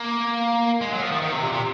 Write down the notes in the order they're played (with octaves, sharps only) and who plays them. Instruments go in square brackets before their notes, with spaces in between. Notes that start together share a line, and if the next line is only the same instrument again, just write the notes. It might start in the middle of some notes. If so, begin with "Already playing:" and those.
Already playing: [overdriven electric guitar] A#3
G#3
F#3
F3
D#3
D#3
C3
A#2
C3